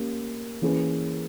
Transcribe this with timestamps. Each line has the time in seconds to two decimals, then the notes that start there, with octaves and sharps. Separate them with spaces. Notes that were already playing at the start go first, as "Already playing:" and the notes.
Already playing: A#3 C#4 G4
0.62 E3 A#3 C#4 G#4 B4